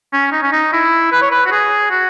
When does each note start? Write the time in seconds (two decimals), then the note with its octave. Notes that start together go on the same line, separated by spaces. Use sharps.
0.13 C#4
0.32 D#4
0.43 C#4
0.52 D#4
0.73 E4
1.12 B4
1.22 C#5
1.31 B4
1.46 F#4
1.52 G#4
1.91 F#4